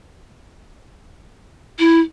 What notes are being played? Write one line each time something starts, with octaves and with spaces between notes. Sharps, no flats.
E4